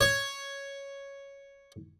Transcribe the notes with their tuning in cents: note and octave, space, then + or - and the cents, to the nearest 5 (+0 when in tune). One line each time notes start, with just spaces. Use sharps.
C#5 +0